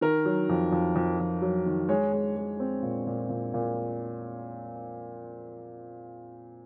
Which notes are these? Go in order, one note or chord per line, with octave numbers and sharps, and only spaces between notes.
D#3 A#4
F#3
F2
F2
F2
F2
F#3
D#3
G#3 C#5
G#3
G#3
C4
A#2
A#2
A#2
A#2